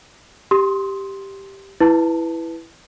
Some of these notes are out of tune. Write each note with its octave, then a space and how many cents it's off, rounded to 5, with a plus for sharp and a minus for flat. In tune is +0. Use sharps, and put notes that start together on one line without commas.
G4 +0 C6 +0 D#6 +25
E4 +5 B4 +0 A5 +0